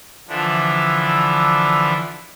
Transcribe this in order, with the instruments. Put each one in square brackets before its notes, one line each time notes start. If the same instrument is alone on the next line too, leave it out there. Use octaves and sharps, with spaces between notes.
[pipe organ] D3 E3 F3 D4 E4